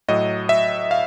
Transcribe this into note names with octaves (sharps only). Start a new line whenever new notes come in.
A2 F#3 D#5
E5
F5